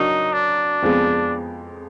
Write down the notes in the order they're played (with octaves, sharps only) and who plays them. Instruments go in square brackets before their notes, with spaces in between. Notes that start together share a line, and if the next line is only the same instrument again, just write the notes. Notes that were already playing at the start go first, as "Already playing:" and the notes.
Already playing: [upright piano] F#3 D4 F#4 A#4 D5 [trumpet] D#4
[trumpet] D4
[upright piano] F2 F3 G#3 B3